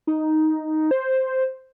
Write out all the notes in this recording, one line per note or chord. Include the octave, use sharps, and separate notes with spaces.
D#4
C5